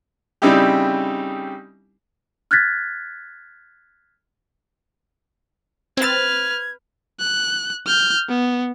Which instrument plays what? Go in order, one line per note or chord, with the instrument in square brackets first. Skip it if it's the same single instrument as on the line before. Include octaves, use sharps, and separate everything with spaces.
[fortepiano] C#3 G3 C4 D#4 E4 G4
[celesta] F6 F#6 G#6 A6 B6
[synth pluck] C4 A6 [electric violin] B4 F6 [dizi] G#6
[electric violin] F#6
F6 G6
B3